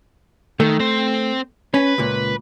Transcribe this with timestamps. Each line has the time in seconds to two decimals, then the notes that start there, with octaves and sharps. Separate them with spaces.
0.60 D#3 A3
0.80 C4 C5
1.74 C#4 B4
1.98 C#2 A#2